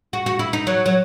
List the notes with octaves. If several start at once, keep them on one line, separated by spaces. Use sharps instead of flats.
F#4
F#4
E4
D#4
F#3
F#3